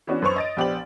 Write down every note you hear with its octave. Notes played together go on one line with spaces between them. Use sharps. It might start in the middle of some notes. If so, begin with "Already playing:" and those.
E3 B3 C#4 D4 F#4
F#2 B4 C5 C#6 F7
D#5 A6 D7
A#1 B3 G4 C5 D5 F#7